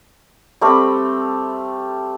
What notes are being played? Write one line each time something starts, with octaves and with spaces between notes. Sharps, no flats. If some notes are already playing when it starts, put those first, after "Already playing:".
G3 A3 C4 B5